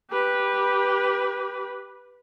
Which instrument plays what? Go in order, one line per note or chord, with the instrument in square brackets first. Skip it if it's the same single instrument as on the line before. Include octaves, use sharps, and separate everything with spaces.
[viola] G4 B4